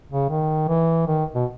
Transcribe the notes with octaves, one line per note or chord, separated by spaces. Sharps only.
C#3
D#3
E3
D#3
B2